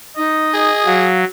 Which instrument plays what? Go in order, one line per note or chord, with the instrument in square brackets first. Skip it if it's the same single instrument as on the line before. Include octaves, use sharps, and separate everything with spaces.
[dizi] D#4 [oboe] D#5
[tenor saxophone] G#4
[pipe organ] F#3 [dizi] F5